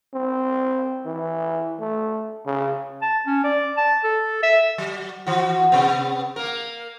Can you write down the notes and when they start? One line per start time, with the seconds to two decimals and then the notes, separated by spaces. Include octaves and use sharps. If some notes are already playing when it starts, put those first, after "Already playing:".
0.14 C4
1.06 E3
1.81 A3
2.46 C#3
3.02 A5
3.27 C#4
3.44 D5
3.77 A5
4.04 A4
4.43 E5
4.78 F#3
5.27 E3 F#4
5.72 C3 B3
6.36 A#3 A#4